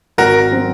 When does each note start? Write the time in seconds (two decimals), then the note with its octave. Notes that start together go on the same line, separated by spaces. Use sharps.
0.18 G#1 F#4 A#4
0.52 F#3 C4